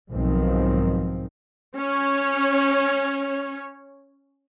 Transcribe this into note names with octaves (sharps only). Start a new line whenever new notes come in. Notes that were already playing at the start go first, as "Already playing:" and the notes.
B1 G#2 D#3 F3 C4
C#4 C#5